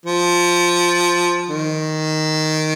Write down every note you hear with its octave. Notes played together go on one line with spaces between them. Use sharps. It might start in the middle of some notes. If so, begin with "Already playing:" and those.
F3
D#3